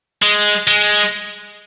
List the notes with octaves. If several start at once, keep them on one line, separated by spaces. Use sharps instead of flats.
G#3
G#3